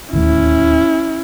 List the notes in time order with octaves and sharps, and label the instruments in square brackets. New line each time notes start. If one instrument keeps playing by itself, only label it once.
[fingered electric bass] D1 D#2 A3 [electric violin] C#4 E4